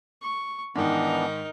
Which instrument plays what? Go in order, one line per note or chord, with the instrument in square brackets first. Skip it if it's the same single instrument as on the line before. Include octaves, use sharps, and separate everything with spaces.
[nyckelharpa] C#6
[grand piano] G#2 D#3 [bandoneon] E3 B3 D4 [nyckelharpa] D#4 A#4